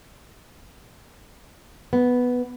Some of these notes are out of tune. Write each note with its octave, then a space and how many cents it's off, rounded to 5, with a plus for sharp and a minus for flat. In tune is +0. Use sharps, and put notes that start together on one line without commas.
B3 +0